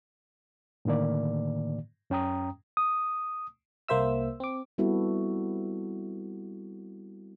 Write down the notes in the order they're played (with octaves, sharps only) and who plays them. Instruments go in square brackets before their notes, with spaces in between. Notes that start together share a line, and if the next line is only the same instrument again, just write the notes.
[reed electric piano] A2 D3 D#3 A#3 D5
F#2 C#4 G5 A#5 D#6
[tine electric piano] D#6
[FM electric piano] C2 A#3 C5 E5 E6
C4 D6
[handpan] G3 B3 C4 E4 F#4 A4